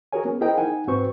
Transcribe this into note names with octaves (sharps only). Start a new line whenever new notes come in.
F#4 G#4 A#4 C#5 G#5
B3 C#4
E4 G#4 A#4 C5 D#5 G5
D#4 F#5 G#5
G#2 C4 F#4 B4 C5 C#6